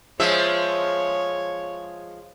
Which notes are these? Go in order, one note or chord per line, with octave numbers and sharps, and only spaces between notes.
F3 G#3 C#5 E5